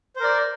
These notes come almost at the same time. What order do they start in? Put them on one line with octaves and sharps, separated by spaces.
C5 A#4 D5